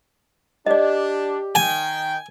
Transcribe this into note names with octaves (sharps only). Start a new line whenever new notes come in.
D4 G4 D5 D#5
D#3 G5 G#5